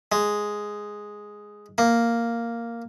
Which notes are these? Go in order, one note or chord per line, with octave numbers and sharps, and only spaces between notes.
G#3
A#3